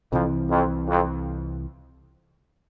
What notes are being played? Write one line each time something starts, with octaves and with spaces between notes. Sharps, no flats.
C2 F2 C3 E3
F2
F2